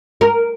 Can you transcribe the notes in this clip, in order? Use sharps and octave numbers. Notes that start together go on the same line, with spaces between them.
A#4